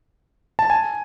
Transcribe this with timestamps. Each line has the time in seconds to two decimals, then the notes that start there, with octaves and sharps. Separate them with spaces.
0.59 A5
0.70 G#5